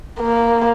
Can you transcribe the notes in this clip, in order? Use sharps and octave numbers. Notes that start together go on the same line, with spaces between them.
A#3